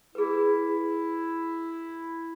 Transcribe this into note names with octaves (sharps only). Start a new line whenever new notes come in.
E4 G#4 B4